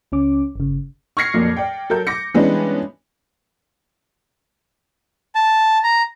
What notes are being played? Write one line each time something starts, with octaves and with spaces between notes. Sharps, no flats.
C#2 C#4 D6
G1 C#3
C#6 F6 G#6 A#6 C7 C#7
F2 A#2 F#3
D5 G5
F#3 A4 A#4 G6
D6 A#6 C#7
E3 G3 G#3 B3 C#4 D4
A5
A#5